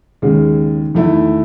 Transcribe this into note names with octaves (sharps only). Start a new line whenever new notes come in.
D#2 C#3 G#3
E2 D#3 A3 E4